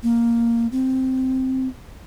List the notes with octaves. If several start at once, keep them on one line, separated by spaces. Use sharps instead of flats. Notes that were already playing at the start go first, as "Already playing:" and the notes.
A#3
C4